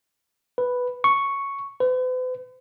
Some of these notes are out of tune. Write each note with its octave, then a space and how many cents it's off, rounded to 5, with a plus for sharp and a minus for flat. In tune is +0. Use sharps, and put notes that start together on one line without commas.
B4 +0
C#6 +0
B4 +45